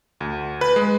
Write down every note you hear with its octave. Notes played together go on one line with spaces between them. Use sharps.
D2
B4
G#3